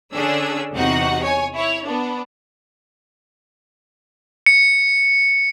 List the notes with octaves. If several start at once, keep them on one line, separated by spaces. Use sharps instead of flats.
D3 C#4 D4 G#4 E6
E2 C3 D#4 F#4 F#5
C#5 G#5
E4 C#5
B3 D4
C#7